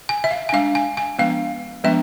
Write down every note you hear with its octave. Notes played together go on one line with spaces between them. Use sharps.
G#5
E5
F5
G#5
G#3 D4 F5
G#5
G#5
F3 G#3 B3 D4 F5
F3 G#3 B3 D4 E5